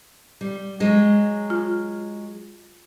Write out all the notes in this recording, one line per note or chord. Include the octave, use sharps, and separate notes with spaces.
G3
F#3 G#3
F4